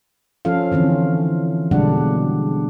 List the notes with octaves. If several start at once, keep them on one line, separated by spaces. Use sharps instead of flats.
F3 C#4 F4 A4 F5
D3 E3 C4 C#4
B2 D3 G3 G#3 D4 F#5